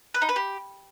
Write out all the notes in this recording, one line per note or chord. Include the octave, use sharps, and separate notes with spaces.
B4
D#4
B4
G4